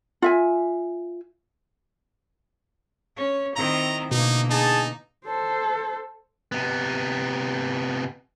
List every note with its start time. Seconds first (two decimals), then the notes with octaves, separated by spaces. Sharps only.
0.22 F4 E5 G#5
3.16 C#4 C#5
3.56 D#3 C4 E4 A#5
4.11 B2 D3 E3 A#3 D#4
4.50 D#4 G#4 A5
5.26 A4 C5
6.52 C3 B3